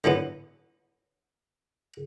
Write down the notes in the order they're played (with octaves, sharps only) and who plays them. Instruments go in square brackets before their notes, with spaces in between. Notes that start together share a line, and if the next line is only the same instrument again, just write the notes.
[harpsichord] D3 E3 F#3 B3